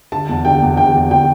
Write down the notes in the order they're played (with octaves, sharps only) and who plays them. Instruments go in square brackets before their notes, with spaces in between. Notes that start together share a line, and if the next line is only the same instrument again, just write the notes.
[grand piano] D3 A5
E2
D3 G5
E2
D3 G5
E2
D3 G5